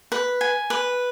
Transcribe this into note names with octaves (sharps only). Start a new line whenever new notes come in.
B4
G#5
B4